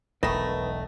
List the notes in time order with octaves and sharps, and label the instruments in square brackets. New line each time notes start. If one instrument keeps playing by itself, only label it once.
[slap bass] E1 B1 [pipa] D#3 A3 [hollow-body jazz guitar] B4 D#5